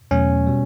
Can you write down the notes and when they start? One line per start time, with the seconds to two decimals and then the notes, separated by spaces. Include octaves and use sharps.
0.11 E2 B2 F#3 A3 C#4
0.47 B2 G3